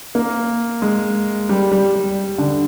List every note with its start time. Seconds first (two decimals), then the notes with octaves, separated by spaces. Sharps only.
0.15 A#3
0.82 G#3
1.49 G3
1.72 G3
1.95 G3
2.38 D3